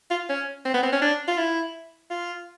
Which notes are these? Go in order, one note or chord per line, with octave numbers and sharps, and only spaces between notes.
F4
C#4
C4
B3
C4
C#4
D4
F4
E4
F4